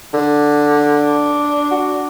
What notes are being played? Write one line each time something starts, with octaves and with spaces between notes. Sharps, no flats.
D3
D4
F#4